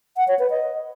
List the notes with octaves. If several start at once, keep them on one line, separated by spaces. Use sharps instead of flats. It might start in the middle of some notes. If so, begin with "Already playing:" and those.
F#5
C#5
B4
D#5